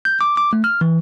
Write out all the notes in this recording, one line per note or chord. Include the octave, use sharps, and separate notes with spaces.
G6
D6
D6
A3
F6
E3